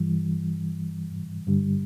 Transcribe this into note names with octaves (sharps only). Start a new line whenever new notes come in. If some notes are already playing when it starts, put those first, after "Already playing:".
Already playing: G2 E3 G3
G2 D3 G3